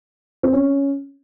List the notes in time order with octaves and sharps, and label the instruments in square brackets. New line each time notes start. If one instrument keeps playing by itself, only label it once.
[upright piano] C4
C#4